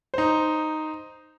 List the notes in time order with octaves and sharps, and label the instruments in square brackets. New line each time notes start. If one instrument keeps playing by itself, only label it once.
[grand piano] D#4 C5